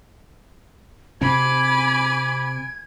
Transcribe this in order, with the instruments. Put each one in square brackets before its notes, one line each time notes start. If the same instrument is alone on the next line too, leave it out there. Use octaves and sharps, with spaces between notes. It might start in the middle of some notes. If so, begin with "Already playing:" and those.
[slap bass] C3 C4 [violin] G#5 D7 [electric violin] B5 D6 [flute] G#6